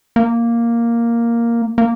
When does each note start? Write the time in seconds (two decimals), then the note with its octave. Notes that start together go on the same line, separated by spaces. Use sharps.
0.16 A#3
1.78 A#3